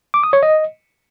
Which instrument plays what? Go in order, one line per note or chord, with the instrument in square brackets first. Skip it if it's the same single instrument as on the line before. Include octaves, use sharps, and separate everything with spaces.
[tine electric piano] D6
D#6
C#5
D#5